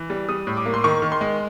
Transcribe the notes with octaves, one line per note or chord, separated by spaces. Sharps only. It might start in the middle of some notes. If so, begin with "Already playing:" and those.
Already playing: E3
G3
G3 D#6
A2
D6
A#3
C6
D#3 C#6
D#3
C6
G#3